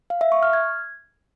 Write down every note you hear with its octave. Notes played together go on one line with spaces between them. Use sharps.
F5
E5
C#6
F6
G#6